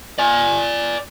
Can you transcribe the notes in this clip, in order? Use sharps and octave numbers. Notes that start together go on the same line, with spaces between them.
D5 G#5